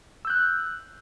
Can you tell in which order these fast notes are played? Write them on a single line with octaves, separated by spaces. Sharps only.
E6 G6 F#6